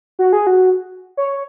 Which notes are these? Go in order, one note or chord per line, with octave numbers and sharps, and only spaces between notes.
F#4
G#4
F#4
C#5